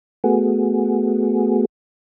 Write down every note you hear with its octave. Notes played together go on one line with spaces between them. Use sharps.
A3 B3 F#4 G#4